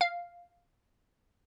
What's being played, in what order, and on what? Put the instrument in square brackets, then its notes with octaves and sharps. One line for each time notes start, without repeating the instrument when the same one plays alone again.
[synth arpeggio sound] F5